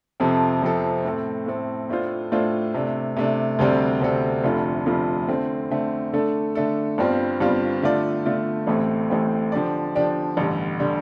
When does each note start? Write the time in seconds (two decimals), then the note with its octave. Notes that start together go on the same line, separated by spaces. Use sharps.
0.20 F2 C3 F3 C4 A4
0.62 F2 C3 F3 C4 A4
1.05 A2 A3 C4 A4
1.46 A2 A3 C4 A4
1.89 A2 A3 D4 F4 C5
2.32 A2 A3 D4 F4 C5
2.74 C3 A3 D4
3.16 C3 A3 D4
3.59 D2 C3 G3 C4 A4
4.01 D2 C3 G3 C4 A4
4.44 F1 F2 D3 A3 F4
4.86 F1 F2 D3 A3 F4
5.29 D3 A3 C4
5.71 D3 A3 C4
6.13 D3 A3 D4 A4
6.55 D3 A3 D4 A4
6.98 G1 G2 G3 C4 F4
7.40 G1 G2 G3 C4 F4
7.83 D3 A3 F4 D5
8.25 D3 A3 F4 D5
8.67 A1 A2 A3 C4 G4
9.10 A1 A2 A3 C4 G4
9.52 D3 F3 D4 G4 D5
9.95 D3 F3 D4 G4 D5
10.37 A1 G2 D3 G3
10.80 D3 G3